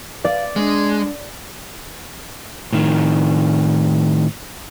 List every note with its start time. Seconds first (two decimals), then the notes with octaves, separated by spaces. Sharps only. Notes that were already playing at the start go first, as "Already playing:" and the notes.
0.25 D5 F5
0.56 G#3 D4
2.73 A2 D#3